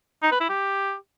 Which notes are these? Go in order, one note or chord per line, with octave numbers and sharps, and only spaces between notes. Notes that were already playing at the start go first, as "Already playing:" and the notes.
D#4
B4
E4
G4